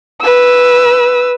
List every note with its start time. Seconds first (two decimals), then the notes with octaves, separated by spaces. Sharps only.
0.21 B4 E6